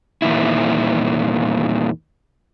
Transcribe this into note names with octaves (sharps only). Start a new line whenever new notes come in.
E2 A#2 D#3 E4